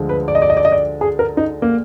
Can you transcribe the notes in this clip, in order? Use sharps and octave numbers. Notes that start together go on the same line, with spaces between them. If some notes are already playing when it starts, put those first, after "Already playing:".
Already playing: D2 D3 F3 G#3
B4
D5
D#5
D5
D#5
D5
D#5
D5
G#4
A#4
D#4
A#3